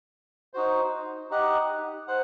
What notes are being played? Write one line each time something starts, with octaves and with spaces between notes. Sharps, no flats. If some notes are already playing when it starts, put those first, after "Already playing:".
D#4 F#4 C5
D#4 G4 D#5 F#5
C5 F#5